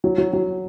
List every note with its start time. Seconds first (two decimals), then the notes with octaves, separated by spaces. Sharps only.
0.04 F#3
0.18 F#3
0.33 F#3